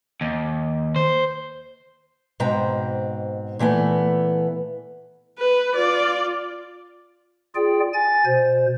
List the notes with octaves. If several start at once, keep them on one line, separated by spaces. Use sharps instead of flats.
D#2
C5
G#2 B2 C4 A#5
A#2 E3 A3 B3
B4
F4 D5
F4 G#4 D5 G5
G#5 A6
B2 C5